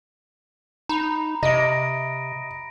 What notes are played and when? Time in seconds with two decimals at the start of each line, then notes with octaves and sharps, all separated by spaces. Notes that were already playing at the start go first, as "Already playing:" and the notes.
0.89 D#4 A#5 B5
1.43 C3 D#5 A#6 D7